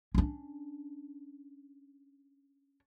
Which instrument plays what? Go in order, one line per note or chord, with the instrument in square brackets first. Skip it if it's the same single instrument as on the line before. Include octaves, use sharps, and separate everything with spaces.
[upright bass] C#4 D4